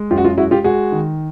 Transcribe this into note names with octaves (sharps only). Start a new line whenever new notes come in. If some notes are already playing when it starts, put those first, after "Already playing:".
Already playing: G#3
F#2 F4 G4
F#4
F4
G#3 E4 F#4
F4 G4
G#3 F#4 G#4
D#3